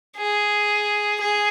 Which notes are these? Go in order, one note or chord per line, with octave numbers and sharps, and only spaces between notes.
G#4
G#4